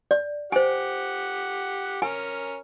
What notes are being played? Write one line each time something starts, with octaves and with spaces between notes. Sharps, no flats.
D5
G4 C5 F#5 G#5
C#4 A#4 G#5